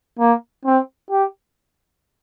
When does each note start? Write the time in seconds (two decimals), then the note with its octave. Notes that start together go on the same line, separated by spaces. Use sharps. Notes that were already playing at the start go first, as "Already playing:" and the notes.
0.19 A#3
0.65 C4
1.11 G4